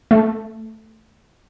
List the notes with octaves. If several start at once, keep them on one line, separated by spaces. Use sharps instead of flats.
A3